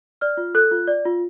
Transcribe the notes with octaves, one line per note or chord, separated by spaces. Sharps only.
D5 F6
F4
A4 F#6
F4
D5
F4